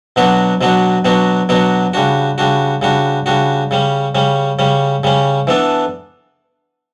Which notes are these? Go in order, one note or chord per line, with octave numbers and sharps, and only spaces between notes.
B2 F#3 B3 D4 F#4
B2 F#3 B3 D4 F#4
B2 F#3 B3 D4 F#4
B2 F#3 B3 D4 F#4
C#3 G3 D4 F#4
C#3 G3 D4 F#4
C#3 G3 D4 F#4
C#3 G3 D4 F#4
C#3 G3 C#4
C#3 G3 C#4
C#3 G3 C#4
C#3 G3 C#4
E3 B3 D4 A4